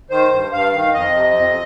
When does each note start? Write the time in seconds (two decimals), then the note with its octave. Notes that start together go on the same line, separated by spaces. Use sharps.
0.10 D#3 C5
0.31 G2
0.52 G2 F5
0.73 D#3
0.93 F2 D#5
1.14 C3
1.36 F2